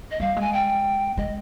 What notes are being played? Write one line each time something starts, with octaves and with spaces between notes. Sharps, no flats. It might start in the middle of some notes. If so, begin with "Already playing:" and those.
D#5
G3 F5
G#3 G#5
G5
G#3 D#5